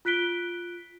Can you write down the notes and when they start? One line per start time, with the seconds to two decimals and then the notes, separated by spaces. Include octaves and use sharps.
0.05 F4 F#6 B6 D7 G7